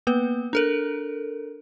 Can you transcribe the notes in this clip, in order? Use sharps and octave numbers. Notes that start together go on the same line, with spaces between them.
A#3 B3 B4
D4 A4 A#4